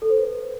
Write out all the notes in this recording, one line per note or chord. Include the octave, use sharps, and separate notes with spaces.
A4
C5
B4